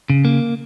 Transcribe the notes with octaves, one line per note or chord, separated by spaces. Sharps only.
C#3
A#3